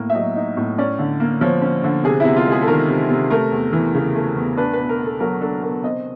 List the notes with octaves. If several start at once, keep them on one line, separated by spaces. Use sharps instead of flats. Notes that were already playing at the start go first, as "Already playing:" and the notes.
Already playing: A2 A#3
E5
F#3 D#5
D#4
A2
C#4 D5
D3
A#3
F3 C#5
C#4
D3
C3 G#4
C3 E4
F4
G#3 G#4
A4
D#3 A#4
C3
C3
A3 A#4
E2
E3
C#3
A3
E2
D4 B4
B2 B4
A#4
B3
A4
F#3 A#4
D4 A4
B2 A#4
C4 D#5